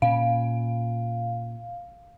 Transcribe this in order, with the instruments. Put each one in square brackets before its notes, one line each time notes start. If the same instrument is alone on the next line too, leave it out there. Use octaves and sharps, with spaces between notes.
[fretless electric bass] A#2 C#4 [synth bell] F5